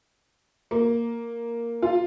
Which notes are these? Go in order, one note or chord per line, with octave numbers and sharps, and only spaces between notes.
A#3
F4